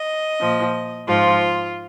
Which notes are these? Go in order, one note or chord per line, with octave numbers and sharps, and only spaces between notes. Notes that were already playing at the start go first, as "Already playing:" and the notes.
Already playing: D#5
A#2 F3
G#2 F3 F4